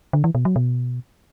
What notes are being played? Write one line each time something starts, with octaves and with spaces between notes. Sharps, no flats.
D3
E3
B2
F#3
B2